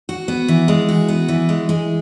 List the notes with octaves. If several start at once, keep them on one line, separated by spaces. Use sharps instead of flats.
F#4
B3
E3
G#3
F#4
B3
E3
G#3
G#3